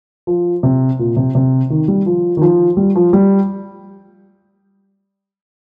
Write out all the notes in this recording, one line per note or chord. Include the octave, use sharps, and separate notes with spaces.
F3
C3
A#2
C3
C3
D#3
G3
F3
D#3
F3
G3
F3
G3